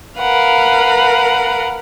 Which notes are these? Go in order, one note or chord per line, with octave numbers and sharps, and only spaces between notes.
A#4 B4 F5 F#5